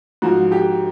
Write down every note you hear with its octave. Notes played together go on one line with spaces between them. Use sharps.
G#2 F3 F#4
G4